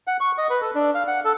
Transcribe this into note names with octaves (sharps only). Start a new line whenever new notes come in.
F#5
C#6
D#5
B4
A4
D4
F5
F#5
A4